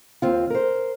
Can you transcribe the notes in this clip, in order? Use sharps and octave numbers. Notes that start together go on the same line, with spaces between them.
D#2 C4 F4
A#4 C5